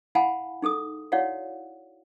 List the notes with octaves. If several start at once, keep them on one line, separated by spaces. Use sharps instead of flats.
E4 F5 F#5 G#5 A5 B5
D#4 G#4 A4 D#6
E4 F#4 C#5 D5 F5 F#5